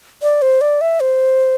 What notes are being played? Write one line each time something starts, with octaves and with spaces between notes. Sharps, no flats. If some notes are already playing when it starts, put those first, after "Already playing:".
D5
C5
D5
E5
C5